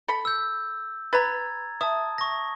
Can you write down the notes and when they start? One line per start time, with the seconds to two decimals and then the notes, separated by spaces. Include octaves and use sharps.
0.08 A4 B5
0.25 E6 G6
1.13 B4 A#5 B5 G#6 A6
1.81 E5 A5 D#6
2.18 C#6 A#6